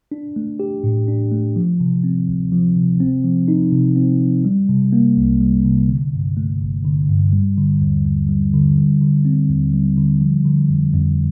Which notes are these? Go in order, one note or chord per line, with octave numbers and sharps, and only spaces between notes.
D4
A3
G4
A2
D4
A3
F3
C3
C4
D2
F3
C3
C4
F3
D#4
C3
C4
F3
G3
C3
A#3
C2
G3
C3
D3
G2
A3
G1
D3
G2
G3
D3
D#2
D#2
G3
D3
G3
D3
C4
D#2
G3
D3
F3
D3
F2
F2